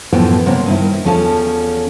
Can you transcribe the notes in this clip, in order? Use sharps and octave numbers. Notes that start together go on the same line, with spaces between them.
F#2 A2 E3 F3 B3 G5
C3 A#3 B3 C#4
G2 D#3 E4
E2 F3 C#4 A4 A5